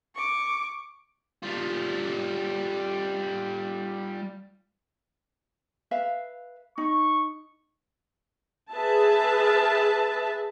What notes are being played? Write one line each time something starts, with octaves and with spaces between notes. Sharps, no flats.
C#6 D6
G3 F4
B4 E5 F5
D#4 C#6
G#4 B4 E5 A5